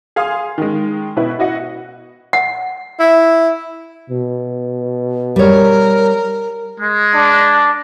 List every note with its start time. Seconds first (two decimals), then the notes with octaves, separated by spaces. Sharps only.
0.16 G#4 F5 G#5 C6 D#6
0.58 D#3 G#3
1.16 B2 E4 B4
1.39 E4 F#4 D#5 F#5
2.33 F#5
2.99 E4
4.10 B2
5.36 G3 A#4 C#5
6.80 G#3
7.14 D4